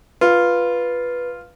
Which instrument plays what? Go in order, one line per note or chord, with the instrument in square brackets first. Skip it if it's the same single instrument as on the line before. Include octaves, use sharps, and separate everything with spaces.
[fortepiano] F4 [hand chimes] B4